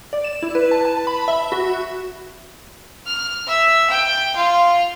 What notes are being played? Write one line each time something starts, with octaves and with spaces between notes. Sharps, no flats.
D5
E7
E4
B4
A5
A5
B5
E5
F#4
F6
E5
G5
F4